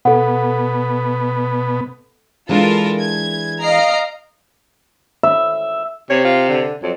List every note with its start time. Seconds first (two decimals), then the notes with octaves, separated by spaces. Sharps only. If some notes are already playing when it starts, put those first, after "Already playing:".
0.05 B2 B3 A4 F#5
2.49 E3 G#3 D4 F4 A4 A#4
2.99 G#6
3.62 D#5 F5 A#5 C7 D7
5.23 E5
6.10 C3 C#5
6.24 F4
6.49 D3
6.83 F2 F#3